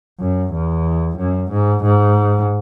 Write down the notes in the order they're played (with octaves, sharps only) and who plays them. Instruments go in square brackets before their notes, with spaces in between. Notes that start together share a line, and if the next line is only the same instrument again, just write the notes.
[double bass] F#2
E2
F#2
G#2
G#2